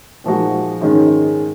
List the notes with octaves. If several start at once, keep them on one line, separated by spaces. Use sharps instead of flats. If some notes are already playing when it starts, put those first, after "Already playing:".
A#2 F3 G#3 D#4 F#4
G#2 D#3 G#3 C#4